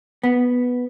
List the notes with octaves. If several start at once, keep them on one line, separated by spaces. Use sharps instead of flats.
B3